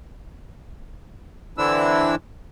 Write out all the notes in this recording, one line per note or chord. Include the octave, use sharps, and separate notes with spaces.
D3 E3 C4 D4 E4 E6